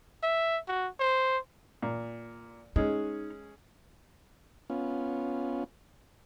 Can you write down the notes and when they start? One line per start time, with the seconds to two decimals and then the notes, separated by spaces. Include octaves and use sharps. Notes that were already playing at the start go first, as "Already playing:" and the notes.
0.23 E5
0.68 F#4
1.00 C5
1.82 A#2
2.76 G#3 C#4 D#4
4.70 B3 C#4 F4